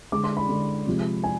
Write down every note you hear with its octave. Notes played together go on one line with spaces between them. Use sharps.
D3 G#3 D6
C6
B5
D3 G#3
C3 F3 G#3
G#5